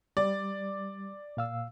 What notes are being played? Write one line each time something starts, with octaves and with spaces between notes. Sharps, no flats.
G3 D5
A#2 F5 E6